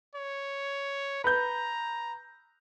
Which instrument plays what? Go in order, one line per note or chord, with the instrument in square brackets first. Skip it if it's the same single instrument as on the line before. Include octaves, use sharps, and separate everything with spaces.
[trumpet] C#5
[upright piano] B4 G6 [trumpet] A#5